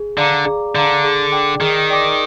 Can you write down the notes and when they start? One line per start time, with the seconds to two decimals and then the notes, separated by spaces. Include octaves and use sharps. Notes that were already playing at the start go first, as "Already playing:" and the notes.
Already playing: G#4
0.18 D3 D5 F5 A#5 D6
0.46 G#4
0.75 D3 D5 F5 A#5 D6
1.04 G#4
1.32 D5 G5 D6
1.61 D#3 G#4
1.90 D5 G5 D6